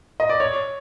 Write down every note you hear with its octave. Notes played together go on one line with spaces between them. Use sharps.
D#5
D5
C#5